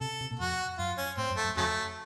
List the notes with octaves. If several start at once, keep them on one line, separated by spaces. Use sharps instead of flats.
C3 A4
C3
A#2
F2 F#4
F#2 F4
C#4
A2 C4
F#2
A3
F#2
F2 C#3 F#3 A3